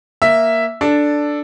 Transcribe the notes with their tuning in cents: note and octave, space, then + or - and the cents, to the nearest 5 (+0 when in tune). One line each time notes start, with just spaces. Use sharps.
A#3 +0 E5 +0
D4 +0 A4 +0